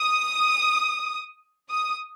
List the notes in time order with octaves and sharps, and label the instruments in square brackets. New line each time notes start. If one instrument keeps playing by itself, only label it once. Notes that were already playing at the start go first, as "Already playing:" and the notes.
Already playing: [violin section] D#6
D#6